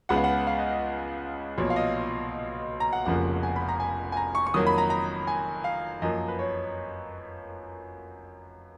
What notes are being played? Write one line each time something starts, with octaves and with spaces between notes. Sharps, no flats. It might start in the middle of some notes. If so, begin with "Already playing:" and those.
C#2 C#3 G#3 B3 F#5
F5
F#5
F5
D#5
D#5
B1 A#2 F3 C#5
F5
D#5
A#5
F#5
F1 F2 C#3 F3 A#3 F#5
G#5
B5
A#5
G#5
G#5
A#5
C#6
C#6
F2 D#3 F#3 A#3 D#6
B5
A#5
A#5
G#5
F5
F#2 F3 A#3 D#5
B4
C#5